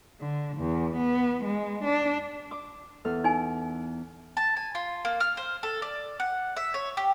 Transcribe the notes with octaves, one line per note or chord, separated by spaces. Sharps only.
D3
E2
B3
G#3
D4
D6
E2 A4 F6
D#4 G#5
A5
G#5
F4
A#3
F6
C5
A4
D5
F#5
E5
C#5
G4